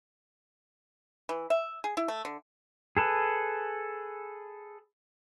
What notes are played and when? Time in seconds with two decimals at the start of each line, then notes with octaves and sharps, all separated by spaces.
1.29 E3
1.50 E5
1.84 G#4
1.97 E4
2.08 A3
2.25 D3
2.97 G#4 A4 B4